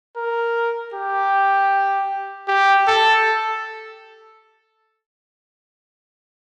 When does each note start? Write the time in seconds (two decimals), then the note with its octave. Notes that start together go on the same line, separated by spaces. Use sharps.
0.16 A#4
0.94 G4
2.48 G4
2.88 A4